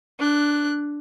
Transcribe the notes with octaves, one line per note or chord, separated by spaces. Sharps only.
D4 F#6